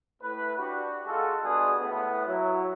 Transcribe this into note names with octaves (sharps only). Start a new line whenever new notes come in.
A2 B4
D4 F#4 G4
G#3 F4 F#4 G#4 A4
G3 G#3 B3 D4 F#4 G#4
A2 B3
F#3 E4